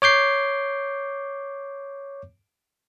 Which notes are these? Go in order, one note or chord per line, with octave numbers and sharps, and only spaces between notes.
C#5 D6 G6 C7